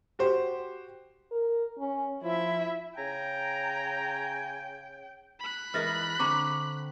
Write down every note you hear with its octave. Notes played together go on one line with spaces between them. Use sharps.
F#4 G4 C5
A#4
C#4
F3 E4 E5
C#3 G5 G#5 A#5
B5 F#6
E3 G#3 A#4 F6 A6 A#6
D3 C4 A#5 C#6 D6